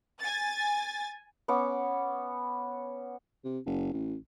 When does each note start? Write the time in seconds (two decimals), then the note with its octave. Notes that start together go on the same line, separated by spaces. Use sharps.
0.20 G#5 A6
1.48 B3 C#4 D6
3.44 C3
3.66 F#1
3.93 A1